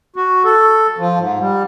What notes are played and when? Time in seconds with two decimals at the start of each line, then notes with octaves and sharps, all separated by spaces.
0.16 F#4
0.45 A4
0.98 F3
1.19 G#2
1.39 G3